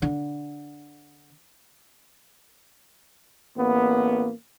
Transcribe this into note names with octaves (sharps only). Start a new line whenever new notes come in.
D3
A1 A#3 B3